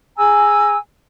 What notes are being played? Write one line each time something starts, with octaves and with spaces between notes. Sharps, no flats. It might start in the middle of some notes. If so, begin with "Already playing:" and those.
G#4 G#5 A#5 E6